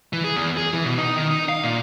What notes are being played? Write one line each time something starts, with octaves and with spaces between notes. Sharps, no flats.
E3
G#4
E2
G#4
E3
B2
D#4
D#3
D#4
F5
A#2